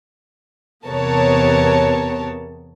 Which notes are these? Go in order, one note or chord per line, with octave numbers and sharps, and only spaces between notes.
E2 C3 B3 A#4 C#5 A5